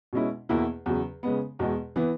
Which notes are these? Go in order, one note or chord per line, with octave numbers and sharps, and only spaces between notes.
B2 G#3 C#4 E4
E2 B2 A#3 E4
E2 C#3 F#3
C#3 G#3 B3
E2 B2 G#3
E3 B3